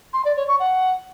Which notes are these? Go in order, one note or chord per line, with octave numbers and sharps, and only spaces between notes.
C6
D5
C#5
C#6
F#5